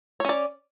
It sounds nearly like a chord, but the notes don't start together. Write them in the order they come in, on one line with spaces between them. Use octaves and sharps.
C#5 C#4 D5